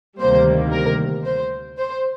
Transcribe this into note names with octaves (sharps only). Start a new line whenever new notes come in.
D2 C3 D#3 G3 A#3 C5
A#4
C5
C5